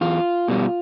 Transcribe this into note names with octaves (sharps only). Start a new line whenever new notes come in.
E2 F4
B2 G3